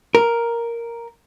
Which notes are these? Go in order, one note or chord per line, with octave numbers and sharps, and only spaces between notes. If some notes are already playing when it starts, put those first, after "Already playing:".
A#4